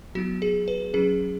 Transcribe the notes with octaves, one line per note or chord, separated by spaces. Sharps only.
F#3 B3 E4 F#4
G#4
B4
F#3 C#4 E4 G#4